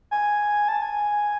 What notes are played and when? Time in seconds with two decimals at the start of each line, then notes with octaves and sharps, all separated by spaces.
0.11 G#5
0.68 A5
0.82 G#5